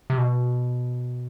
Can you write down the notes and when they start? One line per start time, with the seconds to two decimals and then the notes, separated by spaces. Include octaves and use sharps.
0.10 C3
0.18 B2